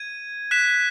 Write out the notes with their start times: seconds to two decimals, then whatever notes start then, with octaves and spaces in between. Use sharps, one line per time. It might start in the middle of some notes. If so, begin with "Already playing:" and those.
Already playing: G#6 D#7
0.51 F#6 B6 E7